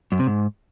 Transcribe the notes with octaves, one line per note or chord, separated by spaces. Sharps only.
F#2
C3
G#2